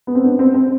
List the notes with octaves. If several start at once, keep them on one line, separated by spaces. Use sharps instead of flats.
B3
C4
B3 D4
C4
C4